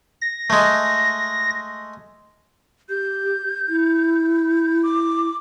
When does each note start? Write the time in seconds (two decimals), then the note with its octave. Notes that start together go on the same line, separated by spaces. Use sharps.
0.21 A#6
0.50 G#3 A3
2.89 G4 G6
3.68 E4
4.83 D6